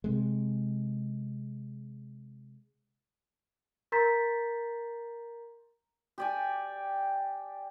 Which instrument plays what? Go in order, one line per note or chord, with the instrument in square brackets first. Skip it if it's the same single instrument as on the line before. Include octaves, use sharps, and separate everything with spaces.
[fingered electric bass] C3 G#3
[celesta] A#4 A#5 C6 G6 A6 B6
[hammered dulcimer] G4 D5 G#5